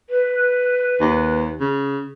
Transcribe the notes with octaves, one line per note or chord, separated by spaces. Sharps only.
B4
D#2
C#3